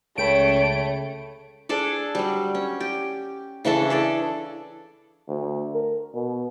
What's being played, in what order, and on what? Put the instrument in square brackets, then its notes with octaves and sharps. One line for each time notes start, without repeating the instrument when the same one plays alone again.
[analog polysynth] C#2 D7 [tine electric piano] C#3 G5 B5 [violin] A3 [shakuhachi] C#5
[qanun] D4 G#4 A4 D5
F#3 G3
C#4
G4
C#3 E3 D4 A4
G#4 A4 D5
[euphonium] D2
A#4
B2